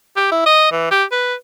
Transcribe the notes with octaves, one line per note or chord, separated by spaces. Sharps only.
G4
E4
D#5
E3
G4
B4